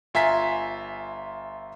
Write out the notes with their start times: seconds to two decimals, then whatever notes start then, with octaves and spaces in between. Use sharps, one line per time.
0.14 G1 F4 E5 G#5 A#5 B6